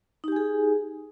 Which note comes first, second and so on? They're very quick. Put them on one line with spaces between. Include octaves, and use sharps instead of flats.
D#4 G4 G#5 G#4